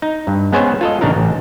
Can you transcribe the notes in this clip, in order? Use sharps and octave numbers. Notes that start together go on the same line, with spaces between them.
D#4
G2
G#3 B3 C#4 G#4 C5 C#5
F4 A4 D#5
A1 C#3 D4 D#4 A#4
A1